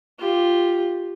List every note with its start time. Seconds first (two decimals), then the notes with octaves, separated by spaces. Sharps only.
0.19 F4 G4